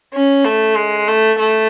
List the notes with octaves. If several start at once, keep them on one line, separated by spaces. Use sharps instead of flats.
C#4
A3
G#3
A3
A3